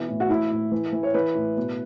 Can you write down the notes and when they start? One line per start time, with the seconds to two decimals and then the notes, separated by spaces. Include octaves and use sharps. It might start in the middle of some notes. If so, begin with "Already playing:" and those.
Already playing: B2 E3
0.08 A2
0.20 F#4
0.29 A2 E4
0.51 A2
0.72 E3
0.93 E3
1.03 C#5
1.14 E3 B4
1.35 A2
1.57 B2